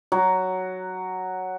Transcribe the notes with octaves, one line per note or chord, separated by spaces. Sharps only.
F#3